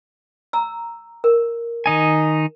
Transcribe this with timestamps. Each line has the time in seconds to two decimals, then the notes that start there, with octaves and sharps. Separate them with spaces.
0.53 A#5 E6
1.24 A#4
1.86 D#3 D#4 G#5